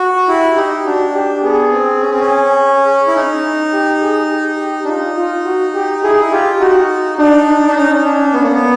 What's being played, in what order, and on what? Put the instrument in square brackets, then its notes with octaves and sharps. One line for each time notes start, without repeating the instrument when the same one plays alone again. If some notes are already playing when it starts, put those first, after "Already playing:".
Already playing: [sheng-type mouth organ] F#4
[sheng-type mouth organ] E4 [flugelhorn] G4
[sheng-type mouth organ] D#4 [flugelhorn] G4
[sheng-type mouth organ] D4 [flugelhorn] F#4
[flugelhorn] G4
[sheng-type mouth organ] B3 [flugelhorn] G#4
[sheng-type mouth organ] C4
C#4
C4
C#4
E4
D#4
[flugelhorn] G4
G#4
G4
G4
[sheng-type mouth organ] D4
[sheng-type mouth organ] D#4 [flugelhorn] F4
[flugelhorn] F4
F#4
G4
[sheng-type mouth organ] E4 [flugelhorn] G#4
[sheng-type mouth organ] D#4
E4
[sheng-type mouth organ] F4 [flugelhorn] G4
[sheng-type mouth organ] D#4 [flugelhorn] F#4
[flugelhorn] D4 [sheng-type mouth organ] D#4
[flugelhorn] D4
[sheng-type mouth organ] D4
[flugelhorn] C#4 [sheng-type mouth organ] D#4
[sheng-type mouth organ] D#4
D4
B3
A#3
B3